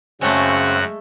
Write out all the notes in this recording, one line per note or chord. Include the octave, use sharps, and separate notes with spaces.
F#2 C#3 G#3 A3 C4 C#4 F#4